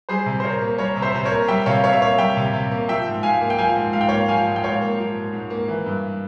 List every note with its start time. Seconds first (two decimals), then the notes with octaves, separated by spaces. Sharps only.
0.09 G3 G#4 C5
0.26 C3
0.40 C5
0.44 C3 A#4 C#5
0.61 A#3
0.78 G3 A#4 C#5
0.96 C3
1.02 C5 E5
1.14 C3 C5
1.25 A#4 C#5
1.31 A#3
1.48 G3 E5 G5
1.66 C3 C#5 F5
1.84 C3 C#5 F5
1.93 E5
2.01 A#3 C#5 F5
2.18 G3 E5 G5
2.37 C3
2.53 C3
2.71 A#3
2.88 F3 E5 G5
3.07 G#2
3.23 G#2 F5 G#5
3.41 A#3
3.50 G5
3.58 F3 F5 G#5
3.75 G#2
3.93 G#2 F5
4.01 G5
4.08 A#3 C#5 F5
4.28 F3 F5 G#5
4.47 G#2
4.56 G5
4.63 G#2 C#5 F5
4.81 A#3
4.98 F3
5.15 G#2
5.33 G#2
5.50 A#3
5.68 E3
5.86 G2